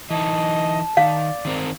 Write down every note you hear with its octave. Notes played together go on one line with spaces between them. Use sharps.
E3 D#4 D#5 A5
D#3 D5 F5
D#3 C4 A#4